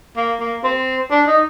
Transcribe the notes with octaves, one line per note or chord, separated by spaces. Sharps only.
A#3
A#3
C4
D4
D#4